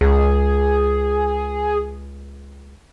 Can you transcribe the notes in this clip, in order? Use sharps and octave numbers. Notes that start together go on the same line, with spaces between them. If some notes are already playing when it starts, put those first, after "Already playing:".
C#2 G#4